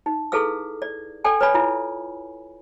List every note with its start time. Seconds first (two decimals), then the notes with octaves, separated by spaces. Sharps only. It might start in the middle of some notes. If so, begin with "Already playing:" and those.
0.06 D#4
0.32 E4 G#4 A4 B4 F5 E6
0.82 D5
1.24 A4 D5 G5 G#5
1.41 B4 C#5 D5 G#5 B5
1.54 E4 F4